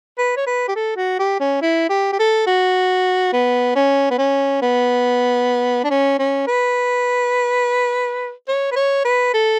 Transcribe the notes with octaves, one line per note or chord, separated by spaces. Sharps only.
B4
C#5
B4
G4
A4
F#4
G4
C#4
E4
G4
G4
A4
F#4
B3
C#4
B3
C#4
B3
D4
C#4
C#4
B4
C#5
B4
C#5
B4
A4